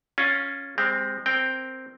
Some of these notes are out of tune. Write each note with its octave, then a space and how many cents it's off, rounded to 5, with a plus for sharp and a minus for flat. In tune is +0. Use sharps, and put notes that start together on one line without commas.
C#4 +0 F4 +10
G#3 -25 C4 +0 G4 +0
C4 +0 A#4 +0 G5 +0